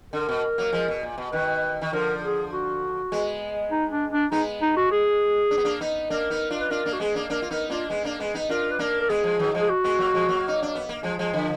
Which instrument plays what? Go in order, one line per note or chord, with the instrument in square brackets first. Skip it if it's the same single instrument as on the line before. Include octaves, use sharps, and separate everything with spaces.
[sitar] D3 [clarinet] A#4
[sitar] B2
F#3 A#3
F3 G#3
B2
A#2
B2
[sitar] B2 D#3 [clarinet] B4
[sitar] D#3
[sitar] D3 F3 [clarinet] A#4
[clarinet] G#4
F#4
[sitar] G#3 B3
[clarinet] D#4
D4
D4
[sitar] G#3 B3 [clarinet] D#4
[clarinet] D#4
F#4
G#4
[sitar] D4
B3
A#3 D4
B3 D#4
[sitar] A#3 D4 [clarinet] A#4
[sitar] B3 D#4
D4 F4
[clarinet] B4
[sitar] D4 F4 [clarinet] A#4
[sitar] A#3 D4
[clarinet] F#4
[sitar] G#3 B3 [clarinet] G#4
[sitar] A#3 D4
[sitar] A#3 D4 [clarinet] A#4
[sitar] F4
[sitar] B3 D#4 [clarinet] A#4
[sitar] A#3 D4 [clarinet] F4
[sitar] G#3 B3
A#3 D4
G#3 B3
B3 D#4
[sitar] D4 F4 [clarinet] A#4
[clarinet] B4
[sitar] A#3 D4 [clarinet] A#4
[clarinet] A#4
[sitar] G#3 B3 [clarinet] G#4
[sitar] F3 G#3
D#3 F#3
F3 G#3
[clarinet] G#4
F#4
[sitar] G#3 B3
F#3 A#3
F3 G#3
F#3 A#3
D#4
D4
B3
A#3
F3 G#3
F3 G#3
D3 F3